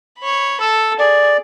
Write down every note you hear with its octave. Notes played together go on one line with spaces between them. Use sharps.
C#5 B5
A4 E6
G#4 D5